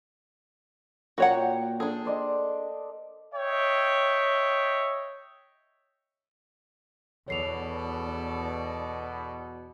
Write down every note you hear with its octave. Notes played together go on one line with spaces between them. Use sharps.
A#2 F#4 C#5 F#5 G5 A#5
D4 G#4 A4
C5 D5 D#5
C#5 D#5 E5 G5
E2 B2 A4 C#5 D5 C7 F7